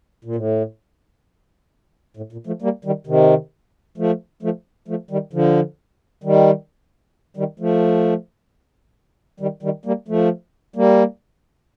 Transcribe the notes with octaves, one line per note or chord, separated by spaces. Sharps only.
A#2
A2
A2
A#2
F3 A3
G3 A#3
D#3 G3
C3 D#3
F3 A3
F3 A3
F3 A3
D#3 G3
D3 F3
D#3 G3
D#3 G3
F3 A3
D#3 G3
D#3 G3
G3 A#3
F3 A3
G3 A#3